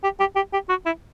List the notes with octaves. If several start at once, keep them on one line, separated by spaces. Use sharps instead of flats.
G4
G4
G4
G4
F#4
E4